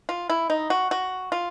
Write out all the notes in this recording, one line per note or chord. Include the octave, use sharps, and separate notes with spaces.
F4
E4
D#4
F#4
F#4
F4